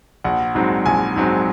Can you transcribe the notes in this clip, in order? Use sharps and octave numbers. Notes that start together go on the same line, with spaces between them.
A#1 F#5
G#2 F#3 C4
A#1 G#5
G#2 F#3 C4